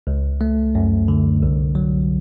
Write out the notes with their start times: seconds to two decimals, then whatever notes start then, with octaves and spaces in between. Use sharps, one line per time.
0.07 C#2
0.41 A3
0.75 F#2
1.08 D3
1.42 C2
1.75 F#3